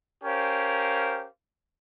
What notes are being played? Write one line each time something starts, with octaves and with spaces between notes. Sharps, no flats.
C#4 G4 A#4 C5 F5